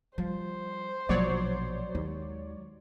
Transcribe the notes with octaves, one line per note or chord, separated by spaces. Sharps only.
F3 G3 C5
A#1 B2 F3 F#3 A#3 C#5 D5
D#2 G#3